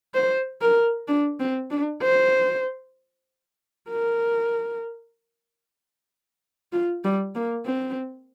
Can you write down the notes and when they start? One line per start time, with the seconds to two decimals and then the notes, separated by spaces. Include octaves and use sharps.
0.14 C5
0.61 A#4
1.08 D4
1.40 C4
1.71 D4
2.02 C5
3.90 A#4
6.72 F4
7.04 G3
7.35 A#3
7.66 C4